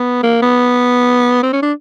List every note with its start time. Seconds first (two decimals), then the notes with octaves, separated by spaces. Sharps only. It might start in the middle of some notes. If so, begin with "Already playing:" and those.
Already playing: B3
0.23 A#3
0.42 B3
1.43 C4
1.53 C#4
1.63 D4